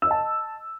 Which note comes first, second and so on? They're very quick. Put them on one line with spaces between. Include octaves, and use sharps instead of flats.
E6 D#5 A5